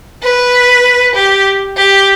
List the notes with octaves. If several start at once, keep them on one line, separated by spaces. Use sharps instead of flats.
B4
G4
G4